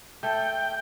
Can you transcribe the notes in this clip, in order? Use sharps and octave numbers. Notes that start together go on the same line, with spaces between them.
A3 A4 G5